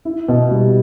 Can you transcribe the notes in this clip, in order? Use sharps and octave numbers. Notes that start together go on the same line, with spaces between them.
E4
B2
G3